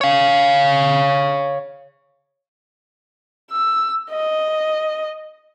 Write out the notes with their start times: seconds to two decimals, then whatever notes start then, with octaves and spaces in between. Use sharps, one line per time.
0.01 C#5 F5
3.51 E6
4.11 D#5